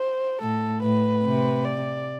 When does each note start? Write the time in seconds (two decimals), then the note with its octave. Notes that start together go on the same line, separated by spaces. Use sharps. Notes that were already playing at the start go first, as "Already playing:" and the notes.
Already playing: C5
0.41 A2 A4
0.83 A2 B4
1.24 C3
1.65 D5